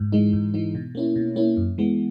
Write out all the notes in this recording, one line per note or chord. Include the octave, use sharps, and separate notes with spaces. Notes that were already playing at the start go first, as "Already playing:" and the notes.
Already playing: G#2
E3 G#3 D#4
G#2
E3 G#3 D#4
B2
A#3 C#4 E4
B2
A#3 C#4 E4
F#2
E3 G#3 B3